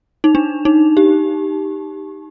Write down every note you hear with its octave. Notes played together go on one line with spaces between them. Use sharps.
D#4
D4
D#4
G4